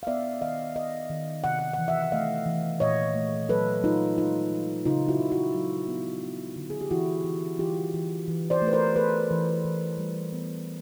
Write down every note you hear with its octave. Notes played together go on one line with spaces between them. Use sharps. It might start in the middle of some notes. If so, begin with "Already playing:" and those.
F5
B3 D5 E5
D#3 D#5 F5
B3 D#5 F5
D#3
C3 F#5
F#5
F#5
E3
E5 F#5
F#5
A3 D#5 F5
E3
A#2 C#5 D#5
A3
F#3 A4 B4
F#3 D#4 F4
G#3 D#4 F4
F3
C#3 D#4 F4
E4 F#4
C#3
E4 F#4
F#3
B3
B3
D3
G#4
G4
E3 E4 F#4
E3
E3 F4 G4
E3
E3
C5 D5
A3
B4
A#4 C5
A3 A4 B4
E3
E3
G3
B3